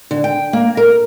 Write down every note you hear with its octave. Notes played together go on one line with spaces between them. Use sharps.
D3
G5
A#3
A#4